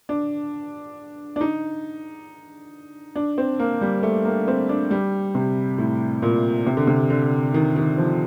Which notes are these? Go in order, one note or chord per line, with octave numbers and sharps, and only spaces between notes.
D4
D4
D#4
D4
C4
A#3
G3
A3
A#3
C4
D4
G3
C3
A2
A#2
C3
D3
C3
D3
D#3
D#3
F3